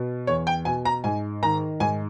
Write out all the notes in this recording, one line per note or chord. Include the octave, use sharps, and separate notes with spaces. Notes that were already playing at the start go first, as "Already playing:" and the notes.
Already playing: B2
E2 C#5
G5
B2 G#5
A#5
G#2 G#5
D#3 A#5
G#2 G#5